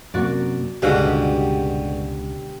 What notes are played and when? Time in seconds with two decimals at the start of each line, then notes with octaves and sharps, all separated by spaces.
0.14 F#2 C3 A#3 F#4 D5
0.82 C#2 G2 B2 D3 G#3 A#3 F#4 G4